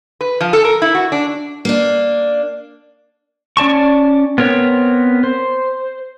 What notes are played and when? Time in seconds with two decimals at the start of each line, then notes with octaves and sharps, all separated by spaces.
0.21 B4
0.40 F3
0.53 A4
0.65 A#4
0.82 E4
0.95 F#4
1.12 D4
1.65 A#3 D4
3.57 C#4 D5 A5 C#6
4.38 B3 C4 A#4 C#5
5.24 C5